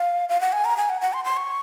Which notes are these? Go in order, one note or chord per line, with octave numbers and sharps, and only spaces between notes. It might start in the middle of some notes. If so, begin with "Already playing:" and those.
Already playing: F5
F5
F#5
G#5
A#5
G#5
F#5
F#5
C6
C6
C#6